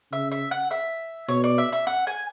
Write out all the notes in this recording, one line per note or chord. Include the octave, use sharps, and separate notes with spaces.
C#3 E5
E5
F#5
E5
B2 C#5
D5
E5
E5
F#5
G#5